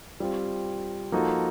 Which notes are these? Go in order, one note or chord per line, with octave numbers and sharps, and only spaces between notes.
G3 C4 F4
F3 A#3 D#4 F#4 A4